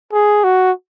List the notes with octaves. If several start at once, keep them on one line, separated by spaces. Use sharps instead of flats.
G#4
F#4